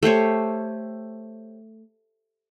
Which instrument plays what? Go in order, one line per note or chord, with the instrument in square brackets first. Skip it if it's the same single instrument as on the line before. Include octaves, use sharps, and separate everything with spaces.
[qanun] A3 G4 C5 C#5